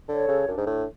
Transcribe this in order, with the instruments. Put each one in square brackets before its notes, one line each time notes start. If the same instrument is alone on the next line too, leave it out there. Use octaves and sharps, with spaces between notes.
[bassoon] D3 [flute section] A4 C#5
[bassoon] C#3
[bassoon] F#2 [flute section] D4
[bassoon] G#2
A2